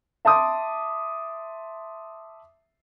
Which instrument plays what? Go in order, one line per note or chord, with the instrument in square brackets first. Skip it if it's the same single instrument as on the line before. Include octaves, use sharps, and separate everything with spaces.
[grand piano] E5 A5 C6 D6 D#6